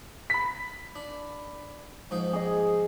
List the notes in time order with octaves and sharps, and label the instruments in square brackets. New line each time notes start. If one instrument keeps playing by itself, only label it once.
[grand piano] B5 B6
[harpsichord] D4
G#2 F3 D#4
[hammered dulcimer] G#4 D#5